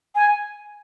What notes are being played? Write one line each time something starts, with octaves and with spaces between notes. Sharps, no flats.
G#5